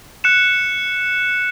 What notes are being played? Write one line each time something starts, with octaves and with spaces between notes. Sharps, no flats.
F#6 C#7 E7